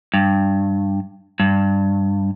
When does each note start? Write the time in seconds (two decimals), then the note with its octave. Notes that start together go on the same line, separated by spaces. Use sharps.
0.14 G2
1.40 G2